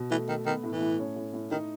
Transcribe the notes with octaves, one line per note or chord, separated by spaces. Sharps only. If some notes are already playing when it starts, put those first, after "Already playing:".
Already playing: B2
E3 A3
D#3 A3
D#3 B3
A2
E3
A2
C#4
A2
A2
D#3 D#4